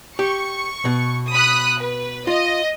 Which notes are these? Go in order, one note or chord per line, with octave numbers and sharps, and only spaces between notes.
G4 C#6
B2
B5 D#6 F#6
B4
F4 D#5